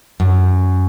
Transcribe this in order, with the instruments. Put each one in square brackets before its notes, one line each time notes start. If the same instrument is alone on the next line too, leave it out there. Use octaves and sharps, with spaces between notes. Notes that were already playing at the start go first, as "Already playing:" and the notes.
[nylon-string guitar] F#2